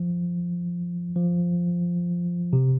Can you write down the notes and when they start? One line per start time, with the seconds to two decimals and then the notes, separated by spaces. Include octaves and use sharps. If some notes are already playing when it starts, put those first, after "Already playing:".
Already playing: F3
1.16 F3
2.53 C3